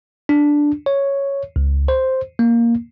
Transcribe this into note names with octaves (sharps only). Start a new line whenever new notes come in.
D4
C#5
C#2
C5
A#3